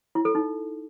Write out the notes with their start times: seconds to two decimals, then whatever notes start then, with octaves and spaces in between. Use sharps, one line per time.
0.15 E4
0.25 A4
0.35 D#4